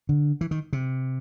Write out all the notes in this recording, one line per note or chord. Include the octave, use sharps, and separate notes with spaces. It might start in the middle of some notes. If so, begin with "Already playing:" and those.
D3
E3
D#3
C3